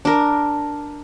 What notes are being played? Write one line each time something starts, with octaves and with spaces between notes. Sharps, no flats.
D4 A#4